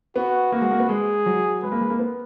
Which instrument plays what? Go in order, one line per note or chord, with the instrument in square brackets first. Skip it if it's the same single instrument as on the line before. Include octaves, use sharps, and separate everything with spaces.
[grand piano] B3 [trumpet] F#4
[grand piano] A#3 [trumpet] F#4
[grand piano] G#3
A#3
B3
[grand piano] G#3 [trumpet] G#4
[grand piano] F#3
[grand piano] G#3 [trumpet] B4
[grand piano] A#3
G#3
A#3
B3